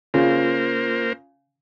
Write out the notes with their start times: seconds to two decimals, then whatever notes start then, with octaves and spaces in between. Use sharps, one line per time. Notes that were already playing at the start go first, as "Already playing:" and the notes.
0.14 C#3 A#3 F4 A#4 C5